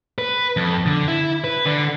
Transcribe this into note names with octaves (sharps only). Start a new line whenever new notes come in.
B4
F2
D3
E4
B4
D3